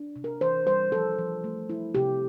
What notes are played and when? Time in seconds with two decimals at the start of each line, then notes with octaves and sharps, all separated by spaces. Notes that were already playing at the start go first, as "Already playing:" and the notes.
Already playing: D4
0.16 C3
0.24 A#4
0.41 E3 C5
0.67 G3 C5
0.92 F3 A4
1.18 F3
1.44 A3
1.70 E4
1.95 C3 G4